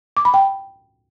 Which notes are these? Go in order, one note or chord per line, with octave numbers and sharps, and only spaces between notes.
D6
B5
G5